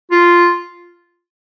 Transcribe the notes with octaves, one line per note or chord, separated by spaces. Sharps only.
F4